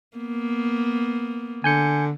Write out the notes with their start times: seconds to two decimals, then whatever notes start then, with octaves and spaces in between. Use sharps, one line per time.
0.17 A#3 B3
1.64 D3 G#5 G6 C#7